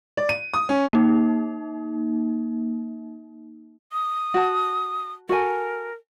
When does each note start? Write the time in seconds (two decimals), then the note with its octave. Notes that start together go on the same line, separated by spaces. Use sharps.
0.17 D5
0.29 D#7
0.54 D#6
0.69 C#4
0.93 A#3 D#4
3.92 D#6
4.34 F#4 A5
5.29 F#4 A4 A#4 G#5